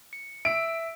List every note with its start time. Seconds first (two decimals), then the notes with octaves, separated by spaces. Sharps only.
0.13 C#7
0.45 E5 E6 D7